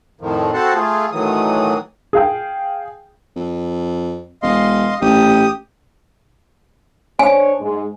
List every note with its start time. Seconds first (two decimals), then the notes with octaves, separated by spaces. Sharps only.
0.21 F2 A2 D#3 F3
0.54 C4 F#4 A4 C5 F#5 A5
0.75 A3 F4 G#4
1.12 A2 D#3 E3 F#3 D#6
2.13 G#4 F5 G5
3.36 F2
4.43 E1 D#5 F5 C6
5.01 A1 G4 D#6
7.19 D4 C5 C#5 G#5
7.60 G#2 G#3